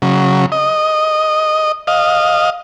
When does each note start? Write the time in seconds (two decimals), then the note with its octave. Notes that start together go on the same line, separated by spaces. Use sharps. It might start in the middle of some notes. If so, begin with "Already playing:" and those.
0.02 C#3 F#3
0.52 D#5
1.87 D#5 F5